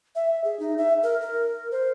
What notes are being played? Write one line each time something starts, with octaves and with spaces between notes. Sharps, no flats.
E5
G#4
D#4
E5
A#4
A#4
C5